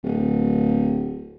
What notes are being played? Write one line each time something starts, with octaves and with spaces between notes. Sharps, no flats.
D1